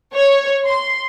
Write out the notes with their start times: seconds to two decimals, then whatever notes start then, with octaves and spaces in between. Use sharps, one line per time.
0.15 C#5
0.64 C6